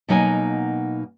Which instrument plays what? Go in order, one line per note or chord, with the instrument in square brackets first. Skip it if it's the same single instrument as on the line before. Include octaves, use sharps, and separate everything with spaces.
[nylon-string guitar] B2 F#3 A#3 D#4 F#5 G#5